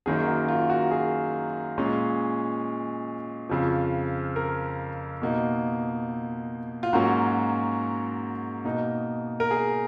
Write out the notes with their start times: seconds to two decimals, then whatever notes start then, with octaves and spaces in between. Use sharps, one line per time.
0.06 F#2 D#3 A#3 C#4 G#4
0.28 F#4
0.49 F4
0.70 F#4
0.91 G#4
1.78 A#2 G#3 C#4
3.49 F2 C#3 F3
4.36 A#4
5.22 B2 A#3 D#4
6.83 F4
6.93 G#2 F#3 A#3 C#4 F#4
8.64 B2 A#3 D#4
9.40 A#4
9.51 G#4